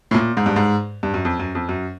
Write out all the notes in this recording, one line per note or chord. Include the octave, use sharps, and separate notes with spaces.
A2
A#2
G#2
G2
G#2
G2
F#2
F2
F#2
F2
F#2